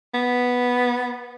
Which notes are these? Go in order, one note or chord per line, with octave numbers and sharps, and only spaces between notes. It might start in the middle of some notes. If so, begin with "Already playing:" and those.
B3